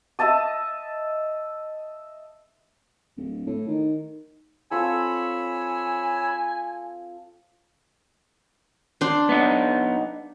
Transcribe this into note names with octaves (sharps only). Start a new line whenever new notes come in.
D#5 E5 A5 D#6
D1
A2
D#3
C4 F4 A4 C#5 G#5 B5 E6
D4 C6
B3 D#4